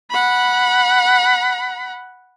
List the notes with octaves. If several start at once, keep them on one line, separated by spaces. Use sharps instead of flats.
F#5 B5